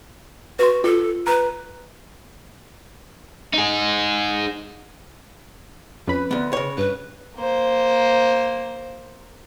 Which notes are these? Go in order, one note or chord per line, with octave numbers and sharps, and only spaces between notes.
F#4 B4 C6
F4 A4
B4 A#5
D#4 G#4
F2 C#4 B4 B5
D2 B3
C#3 C#5
G2 B4
A#3 C5